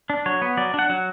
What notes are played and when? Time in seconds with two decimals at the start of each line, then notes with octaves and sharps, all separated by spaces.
0.10 D4
0.26 F#3 C#5
0.42 B3
0.57 F#3 D5
0.74 D4 F#5
0.89 F#3